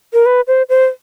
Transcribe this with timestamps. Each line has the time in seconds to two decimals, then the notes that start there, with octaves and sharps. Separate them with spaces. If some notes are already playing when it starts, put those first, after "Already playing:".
0.13 A#4
0.26 B4
0.47 C5
0.69 C5